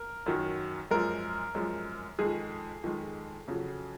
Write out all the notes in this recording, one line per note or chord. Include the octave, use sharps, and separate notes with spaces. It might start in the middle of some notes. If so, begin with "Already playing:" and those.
Already playing: A#4
F#2 D#3 F#3
F#2 F3 G#3 A#4
F#2 F3 G#3
F2 D#3 G#3 G#4
F2 D#3 G#3
F2 C#3 F#3